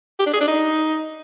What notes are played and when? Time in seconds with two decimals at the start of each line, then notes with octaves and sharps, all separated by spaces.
0.19 G4
0.27 D4
0.34 G#4
0.41 D4
0.48 D#4